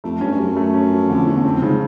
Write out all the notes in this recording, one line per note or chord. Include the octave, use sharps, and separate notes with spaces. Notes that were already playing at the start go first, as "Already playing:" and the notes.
F2 A3
G2 C#4
G2
F#2 C#4
A3
C#4
F3
F2 D3
E2 D3
F2 C4
G#2 C#3